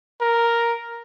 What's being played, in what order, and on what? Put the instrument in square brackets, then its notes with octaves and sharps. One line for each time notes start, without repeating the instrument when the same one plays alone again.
[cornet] A#4